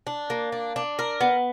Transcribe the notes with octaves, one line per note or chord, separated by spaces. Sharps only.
D4
A#3
D4
D4
A#4
B3